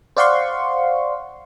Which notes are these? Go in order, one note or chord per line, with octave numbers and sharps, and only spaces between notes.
C5 D5 F5 F#5 C6 C#6